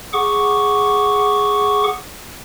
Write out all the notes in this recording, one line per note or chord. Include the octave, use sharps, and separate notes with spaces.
G#4 F#5 C#6 D6